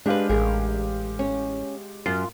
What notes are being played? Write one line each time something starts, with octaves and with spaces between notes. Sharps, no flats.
G#3 D4 G4 B4 F5
A1 G#4 A#4
C#4
F#2 F4